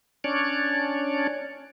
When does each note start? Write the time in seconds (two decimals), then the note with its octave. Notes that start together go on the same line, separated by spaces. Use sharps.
0.24 C#4 D4 C#5 D5